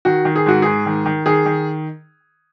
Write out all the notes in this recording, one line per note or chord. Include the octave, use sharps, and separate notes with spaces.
D#3 F#4
D#3
G#4
G#2 F#4
G#2 G#4
D#3
D#3
D#3 G#4
D#3